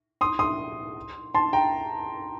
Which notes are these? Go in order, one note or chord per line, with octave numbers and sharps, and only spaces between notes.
C6 D#6
C6 D#6
A5 C6
G5 A#5